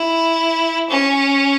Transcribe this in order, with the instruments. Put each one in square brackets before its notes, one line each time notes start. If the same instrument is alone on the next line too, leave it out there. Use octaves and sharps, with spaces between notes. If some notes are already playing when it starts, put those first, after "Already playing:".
Already playing: [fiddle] E4
C#4